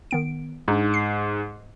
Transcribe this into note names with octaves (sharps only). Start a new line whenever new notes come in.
D#3 B3 D7
G#2 D4 D#4
C7